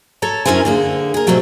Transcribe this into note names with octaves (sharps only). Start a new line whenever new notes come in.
A4 C#5 A#5
F#2 C#4 E4 A#4 C5 G#5
D3 A#3 G#4
G#4 A#4
B2 F#3 G3 A3 C4